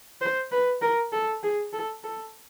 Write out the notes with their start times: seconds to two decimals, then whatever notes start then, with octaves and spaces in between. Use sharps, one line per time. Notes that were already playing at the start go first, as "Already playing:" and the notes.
0.21 C5
0.52 B4
0.82 A#4
1.12 A4
1.43 G#4
1.73 A4
2.04 A4